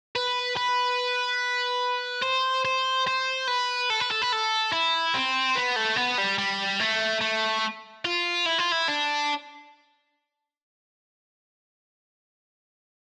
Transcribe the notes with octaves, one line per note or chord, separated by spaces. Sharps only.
B4
B4
C5
C5
C5
B4
A4
B4
A4
B4
A4
E4
C4
B3
A3
B3
G3
G3
A3
A3
F4
E4
F4
E4
D4